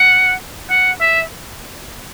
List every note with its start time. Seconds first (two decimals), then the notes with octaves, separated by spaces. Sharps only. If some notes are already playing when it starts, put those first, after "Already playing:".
Already playing: F#5
0.70 F#5
1.01 E5